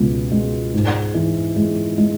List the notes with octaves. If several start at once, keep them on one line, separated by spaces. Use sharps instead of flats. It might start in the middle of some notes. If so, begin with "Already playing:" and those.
Already playing: C#2 B2 B3
G#3
G#2
E3
G#3
G#3